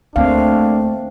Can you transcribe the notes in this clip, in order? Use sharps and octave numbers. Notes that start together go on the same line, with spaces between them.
D2 A3 A#3 C4 D4 F5